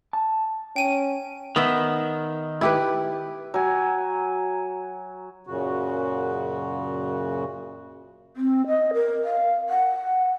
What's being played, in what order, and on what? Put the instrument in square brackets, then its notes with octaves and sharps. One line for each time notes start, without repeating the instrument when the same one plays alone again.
[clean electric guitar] A5
[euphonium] C#4 [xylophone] G5 D#7
[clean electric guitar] D#3 [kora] B3 E5
[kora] E4 G4 B4
[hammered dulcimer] F#3 G#5
[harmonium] F#2 A#2 C#3 F#4
[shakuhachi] C4
D#5
A#4
F5
F#5